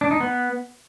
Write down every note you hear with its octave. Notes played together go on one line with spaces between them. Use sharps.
D4
D#4
B3